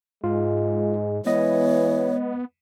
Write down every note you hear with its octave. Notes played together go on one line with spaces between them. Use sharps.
G#2 G#3 F4
E3 G#3 B3 C#5 D#5